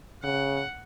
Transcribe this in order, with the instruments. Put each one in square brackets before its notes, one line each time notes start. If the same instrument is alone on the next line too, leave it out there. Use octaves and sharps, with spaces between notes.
[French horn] C#3 [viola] F#5